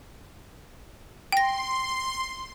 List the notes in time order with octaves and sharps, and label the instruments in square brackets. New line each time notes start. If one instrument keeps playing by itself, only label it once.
[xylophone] G5 A#6 [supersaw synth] C6